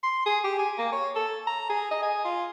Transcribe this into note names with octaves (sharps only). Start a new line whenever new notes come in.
C6
G#4
G4
G#5
A#3
C#5
A4
A#5
G#4
D#5
G#5
F4